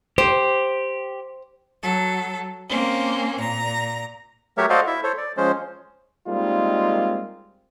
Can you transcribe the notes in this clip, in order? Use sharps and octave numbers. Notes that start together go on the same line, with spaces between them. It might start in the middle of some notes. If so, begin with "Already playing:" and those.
G4 C5
F#3 A4
A#3 C4 C#4
A#2 A#5
F#3 A3 G4 A#4 C#5 E5
F#4 A4 C5 D5 D#5 F5
E4 E5
A4 C5 C#5
D5
F3 G#3 C#4 C5
G3 G#3 A#3 C4 D#4 F4